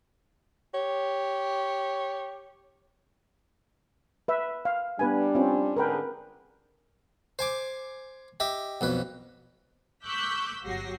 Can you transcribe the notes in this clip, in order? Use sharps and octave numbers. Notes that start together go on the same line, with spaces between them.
G4 C#5
B4 E5
F5
G3 B3 D4 B4 G#5
C4 C#4 F4
G#2 D3 G#4 A#4 B4 G5
C5 G#5 D6
G4 D#5 E5
B1 F2 B4
C#6 D6 E6 F#6 G6 B6
G1 F#3 F#4 G4 A#6 C7